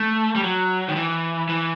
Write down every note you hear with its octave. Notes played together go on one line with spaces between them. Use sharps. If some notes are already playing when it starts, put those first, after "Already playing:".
Already playing: A3
G3
F#3
D#3
E3
E3